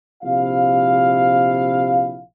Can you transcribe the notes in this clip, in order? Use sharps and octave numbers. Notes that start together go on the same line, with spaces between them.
A#1 C3 E4 F5